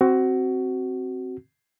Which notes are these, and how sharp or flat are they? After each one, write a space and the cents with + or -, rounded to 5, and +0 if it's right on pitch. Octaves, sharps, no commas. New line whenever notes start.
C4 +0 F#4 +15